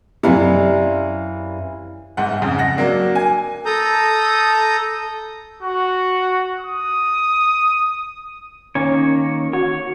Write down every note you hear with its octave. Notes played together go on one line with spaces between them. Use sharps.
F#2 C3 E3 C#4 D5 F5
G1 G#2 F#5
F2 G#2 C#3
F#5 A#6
F#3 A#3 D4
G#5
A4 A#5 D#6 G6
F#4
D#6
D#3 A#3 C#4 C#5
F#4 C#5